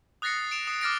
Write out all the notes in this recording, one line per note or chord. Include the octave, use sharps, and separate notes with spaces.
D#6 F#6 A6 A#6 C7 C#7
D7 E7 F7
D#6 C7
D6 F6 A6 A#6 D7